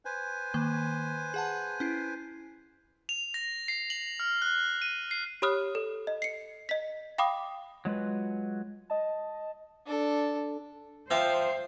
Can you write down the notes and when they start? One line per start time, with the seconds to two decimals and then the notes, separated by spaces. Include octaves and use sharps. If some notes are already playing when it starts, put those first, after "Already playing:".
0.05 B4 C5 G#5
0.54 D#3 A#3
1.34 G#4 F#5 A5
1.80 C#4 E4 C7
3.09 F7
3.34 A#6
3.68 C7
3.90 F#7
4.20 F6
4.42 F#6
4.82 D#7
5.11 C7
5.42 G4 C#5 B5 D#6 F6 F#6
5.75 A4
6.07 D#5
6.22 C7 C#7
6.69 D#5 B6
7.18 F5 G5 B5 D6 D#6
7.85 F#3 G#3 F4 B4
8.90 D#5 A5
9.86 D4 A4
11.10 F3 C5 E5 F5 G5